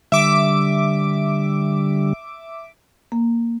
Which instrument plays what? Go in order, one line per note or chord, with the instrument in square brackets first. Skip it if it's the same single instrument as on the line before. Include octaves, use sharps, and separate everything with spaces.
[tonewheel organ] D3 G3 [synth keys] E5 D6
[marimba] A#3